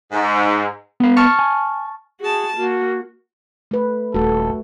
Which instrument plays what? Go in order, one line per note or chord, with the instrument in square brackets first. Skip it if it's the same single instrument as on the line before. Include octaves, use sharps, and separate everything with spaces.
[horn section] G#2
[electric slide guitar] B3 B4 F5
[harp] A5 C#6 F6
[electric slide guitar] G#5
[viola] F#4 A5 [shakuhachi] G#4
[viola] A#3 [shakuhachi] F#4
[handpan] A3 B4
[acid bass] D#1 [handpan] A3 F#4 [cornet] A4